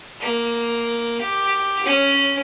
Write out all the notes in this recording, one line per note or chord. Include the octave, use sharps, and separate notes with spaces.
A#3
G4
C#4